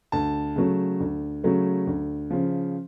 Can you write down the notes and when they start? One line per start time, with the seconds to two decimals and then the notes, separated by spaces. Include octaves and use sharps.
0.12 D2 A5
0.56 C#3 F#3 A3
1.00 D2
1.44 C#3 F#3 A3
1.87 D2
2.30 C#3 F3